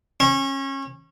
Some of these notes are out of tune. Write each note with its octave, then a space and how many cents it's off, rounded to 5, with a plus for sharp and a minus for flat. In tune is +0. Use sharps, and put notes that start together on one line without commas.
C#4 -25